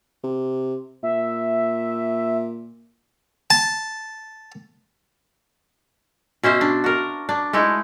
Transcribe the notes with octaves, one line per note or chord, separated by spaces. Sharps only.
C3
A#2 E5
A5
B2 C#4 C5 E5
D4
F#4 A#4
D4
G#3 A3 D#4 E4